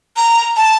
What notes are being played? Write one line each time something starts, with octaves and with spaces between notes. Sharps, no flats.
A#5
A5